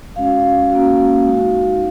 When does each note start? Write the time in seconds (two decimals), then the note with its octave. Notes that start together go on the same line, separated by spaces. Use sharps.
0.16 G#3 C#4 F#4 F5
0.70 A#3 C#4 F#4
1.25 G#3 D#4 F#4